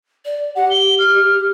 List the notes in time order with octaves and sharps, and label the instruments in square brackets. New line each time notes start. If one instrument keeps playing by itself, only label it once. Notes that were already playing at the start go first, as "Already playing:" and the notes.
[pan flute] D5
[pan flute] G4 [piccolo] F#5
[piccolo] G7
F6